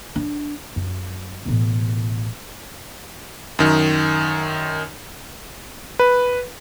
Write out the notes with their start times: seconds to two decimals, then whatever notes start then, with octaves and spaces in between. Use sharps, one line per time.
0.16 D4
0.76 F#2
1.45 A1 B2
3.59 F#2 D#3
5.99 B4